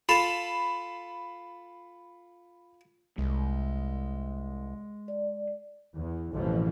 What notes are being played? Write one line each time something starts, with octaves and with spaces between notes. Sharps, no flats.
F4 A4 B5 E7
C2 G#3
D5
E2
A1 F2 B2 E3 F3